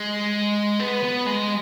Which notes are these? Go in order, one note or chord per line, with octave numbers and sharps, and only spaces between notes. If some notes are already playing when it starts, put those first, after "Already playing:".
Already playing: G#3
B3
B3
G#3